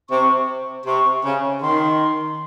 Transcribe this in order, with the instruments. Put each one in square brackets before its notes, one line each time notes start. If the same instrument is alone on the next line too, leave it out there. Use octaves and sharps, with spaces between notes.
[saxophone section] C3 [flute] C#6
[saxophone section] C3 [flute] C#6
[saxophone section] C#3
[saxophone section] D#3 [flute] C6